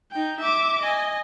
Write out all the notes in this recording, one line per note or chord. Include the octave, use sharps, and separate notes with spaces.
D#4 G5
E5 D6
D#5 G#5